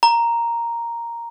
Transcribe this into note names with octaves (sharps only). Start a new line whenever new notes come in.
A#5